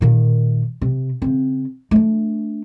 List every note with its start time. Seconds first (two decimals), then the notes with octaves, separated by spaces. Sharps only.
0.01 A#2 D#3
0.81 C3
1.22 C#3 C4
1.91 A3 D4